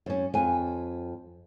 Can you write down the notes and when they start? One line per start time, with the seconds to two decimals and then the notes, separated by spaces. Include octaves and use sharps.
0.06 F#2 C#4
0.34 F2 G#5